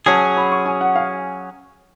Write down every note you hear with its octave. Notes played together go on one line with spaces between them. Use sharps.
F#3 C#4 G#4 A5
B5
C#6
G#5
F#5
F5